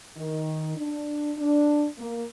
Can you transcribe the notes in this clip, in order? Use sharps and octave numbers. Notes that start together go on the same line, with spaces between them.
D#3
D4
D4
A#3